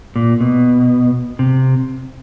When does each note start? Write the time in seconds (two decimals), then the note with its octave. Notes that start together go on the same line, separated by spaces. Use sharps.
0.16 A#2
0.40 B2
1.39 C3